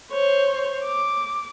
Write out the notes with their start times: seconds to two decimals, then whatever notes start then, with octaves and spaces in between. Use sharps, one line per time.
0.12 C5 C#5
0.84 D6